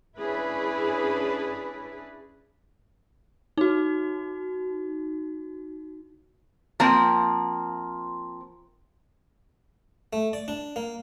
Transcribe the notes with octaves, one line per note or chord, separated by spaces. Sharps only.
C#4 D4 E4 G#4 B4
D#4 F#4
F3 A#3 C4
A3
D5
D4
A#3